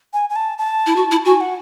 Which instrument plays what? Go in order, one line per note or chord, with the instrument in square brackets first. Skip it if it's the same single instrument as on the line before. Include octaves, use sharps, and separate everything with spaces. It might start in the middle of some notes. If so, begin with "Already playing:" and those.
[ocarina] G#5
G#5
A5
A5
[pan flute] E4
F#4
E4
[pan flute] F#4 [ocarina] G#5
[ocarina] F#5